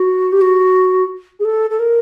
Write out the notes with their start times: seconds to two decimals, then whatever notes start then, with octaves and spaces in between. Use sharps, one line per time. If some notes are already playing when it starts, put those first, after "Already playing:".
Already playing: F#4
0.32 G4
0.41 F#4
1.40 G#4
1.45 A4
1.70 A4
1.79 A#4